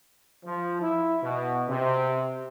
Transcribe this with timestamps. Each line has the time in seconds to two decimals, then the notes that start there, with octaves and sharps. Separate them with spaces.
0.45 F3
0.81 E4
1.22 B2
1.69 C3